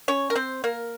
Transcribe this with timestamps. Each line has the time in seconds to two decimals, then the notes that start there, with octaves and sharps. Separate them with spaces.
0.08 C#4 C#5
0.30 A#4
0.36 C4 C5
0.64 A#3 A#4